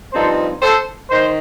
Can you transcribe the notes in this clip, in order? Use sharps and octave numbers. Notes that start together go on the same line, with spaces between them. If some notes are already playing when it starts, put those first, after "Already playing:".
G2 F3 C4 D#4 A4 C5
A4 C5
D#3 C5